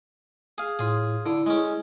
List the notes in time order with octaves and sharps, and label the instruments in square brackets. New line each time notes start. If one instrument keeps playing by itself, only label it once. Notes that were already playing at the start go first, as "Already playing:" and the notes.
[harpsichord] G#4 F5
[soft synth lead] A2 [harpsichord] F4 G#4
[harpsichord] D3 [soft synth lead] E4
[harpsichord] G#3 C#4